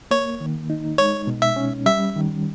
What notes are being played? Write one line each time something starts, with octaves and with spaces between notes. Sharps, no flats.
A#3 C#5
D#3
D#4
G#3 C#5
B2
E5
C#4
G3 E5
D#3